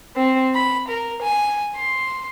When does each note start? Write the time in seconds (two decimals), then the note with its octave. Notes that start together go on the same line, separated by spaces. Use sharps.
0.15 C4
0.54 B5
0.88 A#4
1.23 G#5
1.77 C6